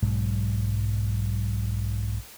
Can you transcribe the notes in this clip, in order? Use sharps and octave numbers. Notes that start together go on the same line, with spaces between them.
B1 G#2 F#3